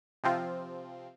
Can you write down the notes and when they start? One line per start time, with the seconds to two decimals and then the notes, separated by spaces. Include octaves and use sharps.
0.24 C3 F3 C4 F4